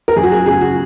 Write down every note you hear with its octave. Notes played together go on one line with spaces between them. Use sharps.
A#4
F#2 G#4
F#4
G#4
C#3 F#3 G#4
F#4